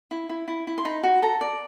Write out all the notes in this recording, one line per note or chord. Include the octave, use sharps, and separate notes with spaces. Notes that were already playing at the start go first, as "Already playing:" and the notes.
E4
E4
E4
E4
C6
D#4 B5
F#4
A4 A#5
D5